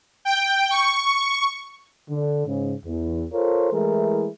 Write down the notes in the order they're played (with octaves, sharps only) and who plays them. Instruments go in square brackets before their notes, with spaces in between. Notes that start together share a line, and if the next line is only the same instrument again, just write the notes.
[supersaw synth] G5
C#6
[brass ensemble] D3
G#2 C#3
E2
F4 A4 A#4 C5 C#5
E3 G#3 A3 E4 G#4 A#4